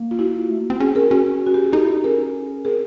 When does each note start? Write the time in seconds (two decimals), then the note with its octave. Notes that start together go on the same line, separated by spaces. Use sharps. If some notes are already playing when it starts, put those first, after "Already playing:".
Already playing: A#3
0.11 F4
0.19 E4 F#4
0.50 A3
0.59 A#3
0.70 C4
0.80 C#4 F#4 G#4
0.95 G#4 A#4
1.11 C#4 F#4 G#4
1.46 F#4
1.54 G4
1.64 G#4
1.72 D#4 G4 A4
1.83 E4
1.94 D#4
2.04 C#4 G#4 A#4
2.65 C4 G#4 A#4